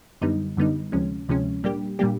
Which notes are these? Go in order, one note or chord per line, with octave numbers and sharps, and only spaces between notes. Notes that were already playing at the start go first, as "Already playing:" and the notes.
F#2 D3 G3 B3 D#4
F#2 D3 G3 B3 D#4
D2 C3 F3 G#3 C#4
D2 C3 F3 G#3 C#4
A#2 G3 A#3 D4 G4
A#2 G3 A#3 D4 G4